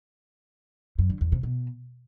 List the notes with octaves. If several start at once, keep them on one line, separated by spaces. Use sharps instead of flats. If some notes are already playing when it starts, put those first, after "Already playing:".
F#2
D3
E2
C3
B2